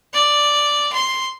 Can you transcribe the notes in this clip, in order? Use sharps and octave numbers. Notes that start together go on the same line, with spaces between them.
D5
C6